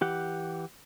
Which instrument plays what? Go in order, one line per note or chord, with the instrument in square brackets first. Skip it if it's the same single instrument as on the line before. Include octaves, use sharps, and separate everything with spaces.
[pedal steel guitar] E3 G4 F#5